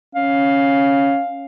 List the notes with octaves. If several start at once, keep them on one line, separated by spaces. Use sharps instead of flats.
C#4 F5